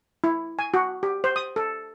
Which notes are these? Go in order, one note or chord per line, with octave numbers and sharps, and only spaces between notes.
E4
G#5
F#4
G4
C5
D#6
A4